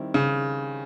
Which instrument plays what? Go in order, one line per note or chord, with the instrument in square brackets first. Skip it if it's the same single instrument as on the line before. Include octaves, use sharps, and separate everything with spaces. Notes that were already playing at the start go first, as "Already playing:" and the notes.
Already playing: [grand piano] D#3 G3 C4 E4
[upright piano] C#3